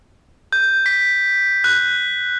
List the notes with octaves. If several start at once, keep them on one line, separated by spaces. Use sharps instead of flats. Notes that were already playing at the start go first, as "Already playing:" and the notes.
G6
B6
F#6